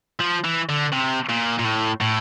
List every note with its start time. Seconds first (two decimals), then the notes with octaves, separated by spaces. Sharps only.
0.20 F3
0.44 E3
0.69 D3
0.92 C3
1.29 A#2
1.59 A#2
1.65 A2
2.01 A2